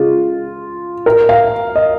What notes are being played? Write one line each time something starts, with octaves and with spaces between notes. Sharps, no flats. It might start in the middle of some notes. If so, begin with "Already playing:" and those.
Already playing: C#3 G#3 F4
A#4
F5
D#5